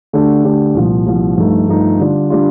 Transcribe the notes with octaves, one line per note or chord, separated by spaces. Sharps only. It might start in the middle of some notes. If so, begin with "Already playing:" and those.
D3 A3 D4 G4
D3 A3 D4 G4
C2 A#2 F3
C2 A#2 F3
G2 F3 A3 D#4
G2 F3 A3 D#4
D3 G3 D4 F4
D3 G3 D4 F4